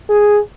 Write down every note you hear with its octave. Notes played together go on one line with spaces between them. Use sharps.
G#4